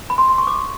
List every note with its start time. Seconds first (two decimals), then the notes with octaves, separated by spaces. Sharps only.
0.10 B5
0.18 C6
0.29 C6
0.38 C#6
0.47 D6